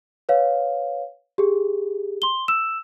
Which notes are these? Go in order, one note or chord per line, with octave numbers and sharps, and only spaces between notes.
B4 C#5 F5
G4 G#4
C6 G7
E6 E7